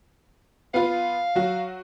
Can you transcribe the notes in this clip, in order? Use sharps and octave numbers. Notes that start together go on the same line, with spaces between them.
B3 F4 F5
F#3 F#4